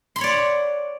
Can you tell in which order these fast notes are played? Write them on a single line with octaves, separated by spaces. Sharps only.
C6 B5 C#5 D5 F#5